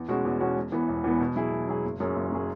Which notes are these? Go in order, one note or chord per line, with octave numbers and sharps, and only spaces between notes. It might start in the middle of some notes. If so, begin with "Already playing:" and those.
Already playing: E2
B2 G#3 C#4 F#4
E2
B2 G#3 C#4 F#4
E1
E2 E3 B3
E1
E2 E3 B3
B2
F#3 E4 G#4
B2
F#3 E4 G#4
F#1
F#2 F#3 C#4 G#4
F#1
F#3 C#4 G#4